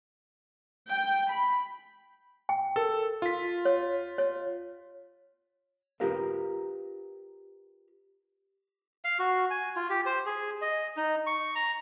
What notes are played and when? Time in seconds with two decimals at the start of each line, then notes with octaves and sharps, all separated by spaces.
0.92 G5
1.31 B5
2.49 G5
2.76 A4 A#4
3.22 F4 B6
3.65 C#5
4.18 C#5
6.00 F4 G4 A#4 B4 F5
9.04 F5
9.19 F#4
9.50 G#5
9.76 F4
9.90 G4
10.06 C5
10.26 G#4
10.62 D#5
10.97 D#4
11.27 C#6
11.55 A#5